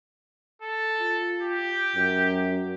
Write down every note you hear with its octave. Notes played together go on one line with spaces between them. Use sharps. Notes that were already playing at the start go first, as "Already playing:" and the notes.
A4
F4
G4
F#2